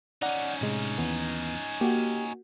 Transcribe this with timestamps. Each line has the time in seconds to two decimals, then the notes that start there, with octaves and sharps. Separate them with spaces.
0.22 C#4 D#4 D5 F#5
0.61 A2 C3 G#3
0.98 D#2 E3 B3
1.81 A#3 F#4 G4